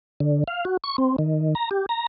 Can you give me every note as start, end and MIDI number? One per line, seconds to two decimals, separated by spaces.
0.20 0.44 50
0.48 0.65 77
0.65 0.77 66
0.84 0.96 85
0.98 1.16 60
1.19 1.55 51
1.55 1.69 82
1.71 1.86 67
1.89 2.07 82